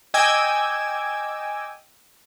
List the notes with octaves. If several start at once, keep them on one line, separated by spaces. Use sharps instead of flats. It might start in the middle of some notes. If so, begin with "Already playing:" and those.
D#5 G5 G#5 D6 E6 G#6